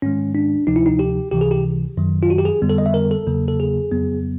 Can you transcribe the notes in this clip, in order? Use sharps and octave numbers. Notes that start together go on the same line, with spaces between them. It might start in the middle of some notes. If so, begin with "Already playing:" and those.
G#2 D#3 G#3 C#4
D4
D2 C3 F3 D#4
E4
D#4
G4
C#2 C3 E3 G4
G#4
G4
F#2 D#3 F#3
F4
F#4
G4
G#4
F2 D3 G3 B3
A4
D#5
E5
A#4
A4
E2 C#3 F#3 A#3
A4
G#4
F2 C#3 F#3 B3